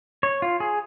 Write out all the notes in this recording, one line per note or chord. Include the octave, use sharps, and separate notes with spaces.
C#5
F4
G#4